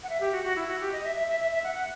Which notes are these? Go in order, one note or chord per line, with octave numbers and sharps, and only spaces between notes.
F#5
E5
G4
F#4
F#4
E4
F#4
G4
D#5
E5
E5
E5
E5
E5
F#5
F#5